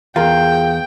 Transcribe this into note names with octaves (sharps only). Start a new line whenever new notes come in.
E2 F4 G#4 A#4 F5 G5